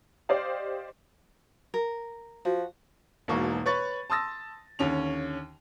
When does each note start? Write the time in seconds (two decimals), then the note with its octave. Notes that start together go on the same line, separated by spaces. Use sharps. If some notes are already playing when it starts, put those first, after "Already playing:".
0.29 G4 C5 D5 D#5 F5
1.74 A#4
2.45 F3 F#4
3.28 E1 G#2 B2 A#3 C#6
3.66 B4 C#5 B5 C#6 A6
4.10 A5 C6 D#6 E6 A6 A#6
4.79 D#2 D3 C#4 F7